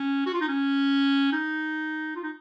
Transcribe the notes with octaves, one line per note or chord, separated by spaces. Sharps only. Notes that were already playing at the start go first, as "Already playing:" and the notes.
Already playing: C#4
F#4
F4
D#4
C#4
D#4
F4
D#4